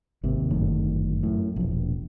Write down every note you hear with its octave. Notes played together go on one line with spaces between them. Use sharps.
G#1 D#2 C3
G1 F#2 A2 D#3
F#2 A2
E1 A#1